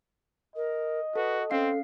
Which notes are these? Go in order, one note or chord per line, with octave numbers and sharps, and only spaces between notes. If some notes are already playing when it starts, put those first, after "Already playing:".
A#4 D#5
F#4 A4 B4
C4 C#4 A4 F5 C7